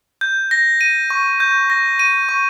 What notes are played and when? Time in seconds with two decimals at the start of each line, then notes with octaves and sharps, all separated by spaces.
0.21 G6
0.51 A#6
0.81 D#7
1.10 C#6
1.40 G6
1.70 A#6
1.99 D#7
2.29 C#6